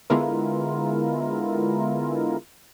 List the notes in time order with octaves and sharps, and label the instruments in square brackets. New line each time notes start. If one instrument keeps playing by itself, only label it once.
[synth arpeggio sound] D3 G#3 B3 E4 F4 A#4